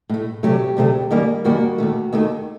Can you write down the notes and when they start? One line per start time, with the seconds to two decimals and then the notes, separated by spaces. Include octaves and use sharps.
0.09 A2 A3
0.43 D2 C3 F#3 A3 G4
0.77 D2 C3 F#3 A3
1.10 F#2 D#3 G3 A#3
1.44 F#2 D#3 G3 A#3 F#4
1.78 D#2 D#3 A3
2.13 D#2 D#3 A3